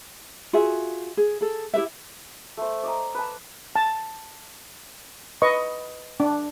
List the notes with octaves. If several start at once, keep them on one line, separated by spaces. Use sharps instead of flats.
F4 F#4 G#4 E5
G#4
G#4 A4
E4 G4 B4 E5
A3 C5
D5 D#5 A#5
B4 A5
A5
B4 D#5 C#6
D4